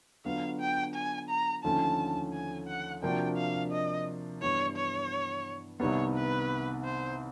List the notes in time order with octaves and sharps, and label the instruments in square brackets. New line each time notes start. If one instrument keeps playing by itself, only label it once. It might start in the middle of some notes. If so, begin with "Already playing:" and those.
[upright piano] D3 F#3 B3 D4 F4 [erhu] F5
[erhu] G5
G#5
A#5
[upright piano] D#2 D3 F3 A3 C#4 [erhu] A5
[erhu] G#5
F#5
[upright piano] C3 F3 A#3 D4 F#4 [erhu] G5
[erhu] F5
D#5
[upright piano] G2 E3 G3 B3 [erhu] C#5
[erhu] C#5
[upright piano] C2 C3 D#3 G3 B3 [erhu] C#5
[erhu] B4
C5